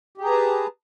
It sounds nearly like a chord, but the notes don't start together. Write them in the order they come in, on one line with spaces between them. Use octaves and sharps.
G4 G#4 A#5 B4 A5